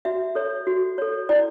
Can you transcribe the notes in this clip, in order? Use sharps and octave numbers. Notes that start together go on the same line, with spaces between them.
F#4 E5
A4 C#5
F#4
A4 C#5
E4 D5